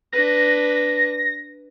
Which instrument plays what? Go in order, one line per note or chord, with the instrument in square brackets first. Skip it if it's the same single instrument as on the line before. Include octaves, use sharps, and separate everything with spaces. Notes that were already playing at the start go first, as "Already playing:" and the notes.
[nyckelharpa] D4 B4 [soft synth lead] A#6